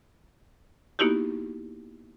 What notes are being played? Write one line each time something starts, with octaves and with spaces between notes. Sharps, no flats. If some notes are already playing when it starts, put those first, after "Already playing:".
A#3 B3 D#4 E4 F#4 G4